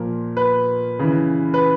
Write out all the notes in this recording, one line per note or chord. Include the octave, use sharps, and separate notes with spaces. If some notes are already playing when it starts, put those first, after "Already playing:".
Already playing: A#2 F3 A#4
B4
C#3 E3
B4